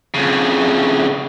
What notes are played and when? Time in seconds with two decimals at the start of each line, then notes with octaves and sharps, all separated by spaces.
0.14 F2 C#3